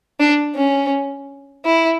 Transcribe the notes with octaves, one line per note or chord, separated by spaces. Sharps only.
D4
C#4
E4